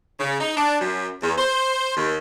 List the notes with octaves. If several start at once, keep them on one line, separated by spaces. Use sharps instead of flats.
C#3
D#4
D4
F#2
E2
C5
D#2